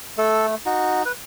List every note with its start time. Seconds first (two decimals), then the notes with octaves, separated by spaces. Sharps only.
0.18 A3 A4
0.66 D#4 F#4
1.05 B4